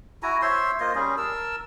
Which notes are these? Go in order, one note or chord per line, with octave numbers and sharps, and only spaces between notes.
E4 F#4 G#5 A#5
C5 C#5 E5 C6
A#3 F4 C5 D#5
G3 C#4 G#4
A#4 A5 E6